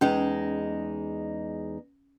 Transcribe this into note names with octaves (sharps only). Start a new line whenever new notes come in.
E2 G#3 C#4 D#4